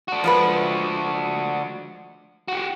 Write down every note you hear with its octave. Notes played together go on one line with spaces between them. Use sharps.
D4 F#4
F3 G#3 B4
F#4 G4